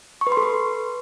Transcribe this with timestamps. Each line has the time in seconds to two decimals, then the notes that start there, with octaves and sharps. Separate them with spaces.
0.21 C#6
0.27 B4
0.32 C6
0.37 A4
0.43 B4